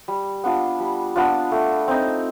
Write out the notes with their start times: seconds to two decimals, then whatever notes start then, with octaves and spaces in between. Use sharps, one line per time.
0.08 G3
0.44 B3 D4 F4
0.80 G3
1.16 B3 D4 F4
1.51 A3
1.88 C4 D#4